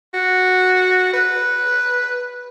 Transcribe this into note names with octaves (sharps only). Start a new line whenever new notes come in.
F#4
B4